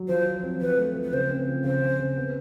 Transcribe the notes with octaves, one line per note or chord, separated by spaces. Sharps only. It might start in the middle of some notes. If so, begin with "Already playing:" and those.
Already playing: F#3
F3 C5
F3
C4
F3 B4
A3
F3
B4
C#3 C5
C4
F3
C#3 C5
C#3
C#3
B3